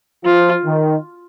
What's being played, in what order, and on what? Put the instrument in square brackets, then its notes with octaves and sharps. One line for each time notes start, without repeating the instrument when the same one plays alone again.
[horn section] F3 [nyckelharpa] F4
[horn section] D#3